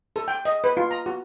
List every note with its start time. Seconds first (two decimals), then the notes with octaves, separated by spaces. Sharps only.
0.16 A4
0.28 G5
0.45 D#5
0.64 B4
0.77 F4
0.91 A#5
1.06 F#4